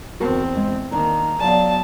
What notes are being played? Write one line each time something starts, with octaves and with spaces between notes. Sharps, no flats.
E2 C4 F#4 A#4 A5
G#3
D#3 A#3 D4 A#5
F#3 B3 D5 F5 A5